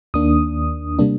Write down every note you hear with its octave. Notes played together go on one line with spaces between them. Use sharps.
D#2 D#3 A#3 D4 D#6
C3 G3 A#3 D4